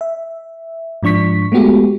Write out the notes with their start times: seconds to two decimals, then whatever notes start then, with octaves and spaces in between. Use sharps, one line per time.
0.01 E5
1.03 G#2 F3 D4 C#6 B6
1.52 G#3 A3 B3 F#4 G4